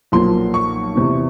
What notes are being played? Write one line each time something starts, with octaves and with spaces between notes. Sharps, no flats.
B1 A#2 F3 A#3 C6
C#6
E2 C3 E3